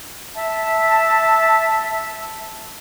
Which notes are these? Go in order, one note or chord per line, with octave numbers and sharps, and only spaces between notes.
E5 A5